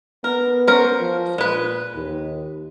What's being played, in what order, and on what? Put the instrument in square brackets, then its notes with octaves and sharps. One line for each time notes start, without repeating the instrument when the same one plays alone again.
[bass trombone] B3 [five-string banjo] A#4
[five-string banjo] C#4 A#4 C5
[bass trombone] F3
[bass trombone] A#2 [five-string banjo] G#3 B4
[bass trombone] D#2